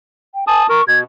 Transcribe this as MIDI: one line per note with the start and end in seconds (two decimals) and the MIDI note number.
0.35 0.45 79
0.47 0.63 80
0.47 0.67 81
0.47 0.67 87
0.69 0.81 70
0.69 0.84 85
0.88 1.04 47
0.88 0.99 92